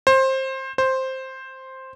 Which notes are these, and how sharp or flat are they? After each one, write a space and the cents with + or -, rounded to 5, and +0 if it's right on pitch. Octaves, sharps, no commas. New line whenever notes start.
C5 +20
C5 +5